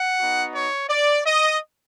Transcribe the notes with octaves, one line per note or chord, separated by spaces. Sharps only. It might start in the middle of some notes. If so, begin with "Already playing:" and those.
Already playing: F#5
B3 D#4 F#4
C#5
D5
D#5